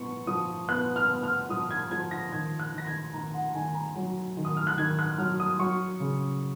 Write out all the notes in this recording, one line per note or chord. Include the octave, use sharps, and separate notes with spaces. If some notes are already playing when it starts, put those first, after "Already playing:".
Already playing: F3 B3 C#6
F3 D#6
B3 F#6
F6
B3
F6
F3 D#6
G#6
F3 G#6
A#6
D#3 G#6
F#6
D#3
A#6
G#6
D#3 A#5
F#5
D#3 G#5
A#5
F#3
D#3
D#6
F6
F#6
D#3 G#6
F#6
F#3 F6
D#6
F#3 C#6
C#3